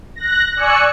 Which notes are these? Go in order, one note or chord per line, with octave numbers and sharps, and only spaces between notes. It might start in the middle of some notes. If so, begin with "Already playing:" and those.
F#6 A#6
D5 G#5 C#6 E6 F#6 C#7